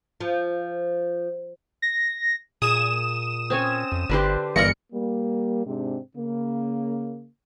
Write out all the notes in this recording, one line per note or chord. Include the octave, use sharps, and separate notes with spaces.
F3
A#6
A#2 G#4 D#6 E7
C4 C#4 C#5
F2
G1 D3 D4 G4 B4 C5
G1 G2 E3 A#4 D5 D#5 C#7
G3 A#3
G#2 C3 G#3 C4 D4
C#3 A#3